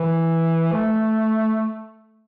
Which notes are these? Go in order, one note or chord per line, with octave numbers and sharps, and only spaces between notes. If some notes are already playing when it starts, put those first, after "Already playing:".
Already playing: E3
A3